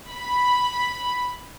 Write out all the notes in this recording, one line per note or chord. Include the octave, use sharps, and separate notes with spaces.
B5